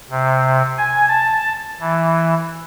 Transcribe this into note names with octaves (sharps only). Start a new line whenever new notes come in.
C3
G#5
A5
E3